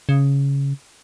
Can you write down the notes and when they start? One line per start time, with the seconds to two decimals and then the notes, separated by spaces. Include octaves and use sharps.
0.09 C#3